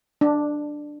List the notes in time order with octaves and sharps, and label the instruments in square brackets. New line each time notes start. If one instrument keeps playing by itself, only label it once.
[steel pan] D4